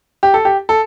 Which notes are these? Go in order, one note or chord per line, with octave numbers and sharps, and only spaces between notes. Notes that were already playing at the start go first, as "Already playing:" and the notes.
G4
A4
G4
A4